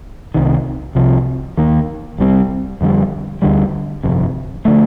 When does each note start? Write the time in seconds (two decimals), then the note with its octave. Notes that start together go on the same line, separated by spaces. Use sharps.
0.34 C2 C3 D#3
0.95 C2 C3 F3
1.57 D#2 D#3 A#3
2.18 C2 C3 G3 C4
2.81 F2 D3 G3
3.42 D2 D3 G3
4.03 G1 F2 C3
4.65 D3 F3 A3